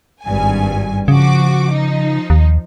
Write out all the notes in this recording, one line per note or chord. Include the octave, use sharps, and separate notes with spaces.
G#1 G2 G#5
C#3 F3 F#4 D6
F3 D#4
D#2